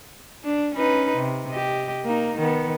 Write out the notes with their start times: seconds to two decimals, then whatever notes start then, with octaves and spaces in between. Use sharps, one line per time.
0.44 D4
0.75 C#4 D#4 B4
1.17 C3
1.50 G4 D#5
2.05 A#3 D#4
2.39 D#3 B3